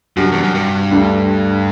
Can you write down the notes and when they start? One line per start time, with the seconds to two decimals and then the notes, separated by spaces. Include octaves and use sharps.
0.17 F#2 C3 G3 D4 F#4
0.32 E2
0.43 F#2
0.54 G2
0.91 D2 D3 G3 D4